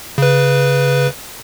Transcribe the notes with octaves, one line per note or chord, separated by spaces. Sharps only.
C#3 B4